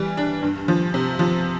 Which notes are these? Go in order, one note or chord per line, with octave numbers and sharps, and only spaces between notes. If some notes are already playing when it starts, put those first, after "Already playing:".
Already playing: E3 G3
D4
G2
F3
C3
F3